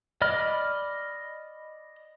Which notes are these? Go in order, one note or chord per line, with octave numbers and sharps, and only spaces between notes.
D5 D#5 B5 F6